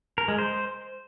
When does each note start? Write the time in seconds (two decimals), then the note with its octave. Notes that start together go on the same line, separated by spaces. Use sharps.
0.18 A#4
0.28 G#3
0.39 C5